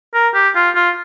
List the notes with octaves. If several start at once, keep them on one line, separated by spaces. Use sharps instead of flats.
A#4
G4
F4
F4